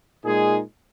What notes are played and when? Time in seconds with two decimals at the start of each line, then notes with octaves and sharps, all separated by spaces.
0.24 A#2 G#3 D#4 G#4